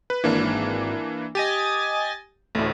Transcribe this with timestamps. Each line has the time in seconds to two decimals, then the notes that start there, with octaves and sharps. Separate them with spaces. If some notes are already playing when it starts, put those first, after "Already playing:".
0.10 B4
0.24 G#1 E3 A#3 D4
1.35 G4 D#5 G#5 A6
2.55 A1 D2 A2